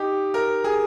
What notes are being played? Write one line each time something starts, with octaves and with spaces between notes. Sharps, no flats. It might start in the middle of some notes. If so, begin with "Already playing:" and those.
Already playing: D#4 G4
A#4
G#4